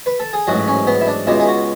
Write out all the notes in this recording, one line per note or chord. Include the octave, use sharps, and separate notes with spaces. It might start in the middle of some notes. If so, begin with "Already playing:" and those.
B4
A4
G#4
A1 G#2 F#3 F#4
C#4
B3
E4
D4
C#2 B2 G#3 E4
G#4
F#4